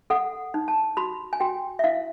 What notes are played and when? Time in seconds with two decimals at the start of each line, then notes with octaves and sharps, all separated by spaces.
0.10 A4 F#5
0.54 D#4
0.68 A5
0.97 F#4 B5
1.33 G#5
1.40 F#4 G5
1.79 E5
1.84 E4 F5